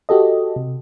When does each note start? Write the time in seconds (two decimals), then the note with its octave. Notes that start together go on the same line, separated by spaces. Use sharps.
0.09 F#4 G4 A4 D#5
0.56 C3